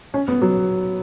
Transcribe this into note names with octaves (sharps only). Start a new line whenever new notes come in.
C#4
B3
F#3